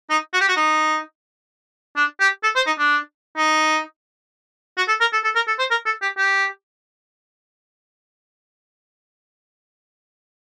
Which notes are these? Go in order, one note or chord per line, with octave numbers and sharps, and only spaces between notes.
D#4
F#4
G4
F#4
D#4
D4
G4
A4
C5
D#4
D4
D#4
F#4
A4
A#4
A4
A4
A#4
A4
C5
A#4
A4
G4
G4